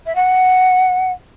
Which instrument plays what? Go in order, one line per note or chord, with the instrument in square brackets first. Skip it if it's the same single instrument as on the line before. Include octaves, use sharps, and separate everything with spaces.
[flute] E5
F#5